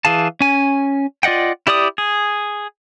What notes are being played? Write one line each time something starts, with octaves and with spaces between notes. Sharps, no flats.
E3 G#4 F5 A5
C#4 G#5
F4 D5 D#5 F#5 G5
E4 G4 D5 D6 D#6
G#4